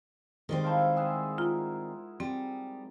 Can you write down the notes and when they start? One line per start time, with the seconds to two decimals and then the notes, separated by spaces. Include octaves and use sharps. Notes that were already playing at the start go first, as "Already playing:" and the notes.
0.49 G#2 D#3 G3 C4
0.64 E4 C5 F5 A5 C6
0.96 G#4 E5 F#5
1.38 F4 A#4
2.20 G3 C4